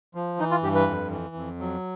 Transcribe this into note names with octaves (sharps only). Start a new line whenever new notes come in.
F3
E3 D#4
F4
G2 G4
B4
F2
E3
F2
F#3